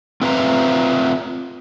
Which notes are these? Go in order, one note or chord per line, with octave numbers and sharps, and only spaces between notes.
C4 F4 B4 E5 F5 A#5